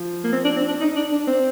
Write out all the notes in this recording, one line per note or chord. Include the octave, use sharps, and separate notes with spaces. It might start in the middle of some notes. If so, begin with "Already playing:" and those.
Already playing: F3
A#3
C4
D4
C4
D4
D#4
D4
D4
C4